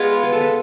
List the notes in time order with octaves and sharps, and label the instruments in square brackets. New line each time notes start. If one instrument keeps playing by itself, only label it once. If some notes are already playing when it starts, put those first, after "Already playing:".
Already playing: [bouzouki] G#3 B3 F4
[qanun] B4
A4
B4